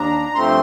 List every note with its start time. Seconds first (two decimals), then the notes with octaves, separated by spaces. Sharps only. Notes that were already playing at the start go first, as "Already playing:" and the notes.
Already playing: D#2 D4 A#5
0.35 G2 F3 A3 C4 C6